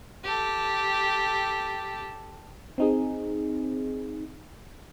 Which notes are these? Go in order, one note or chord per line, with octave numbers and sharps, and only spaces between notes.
G4 A4
C4 D#4 G#4